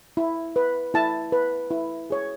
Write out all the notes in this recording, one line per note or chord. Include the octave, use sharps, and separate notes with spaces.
E4
B4
E4 A5
B4
E4
G#4 C#5